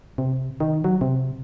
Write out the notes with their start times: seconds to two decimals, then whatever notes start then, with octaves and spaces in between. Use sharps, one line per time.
0.18 C3
0.60 D#3
0.84 F#3
1.01 C3